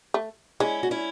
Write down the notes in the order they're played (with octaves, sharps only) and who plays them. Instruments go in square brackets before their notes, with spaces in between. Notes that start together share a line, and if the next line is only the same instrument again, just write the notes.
[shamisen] A3
[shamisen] G#3 [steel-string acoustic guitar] C#4 E4
[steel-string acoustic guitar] F#4
C#4 E4